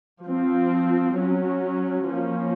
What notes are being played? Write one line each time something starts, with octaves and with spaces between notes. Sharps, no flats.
F3 C4
F#3 C#4
F3 A#3 C#4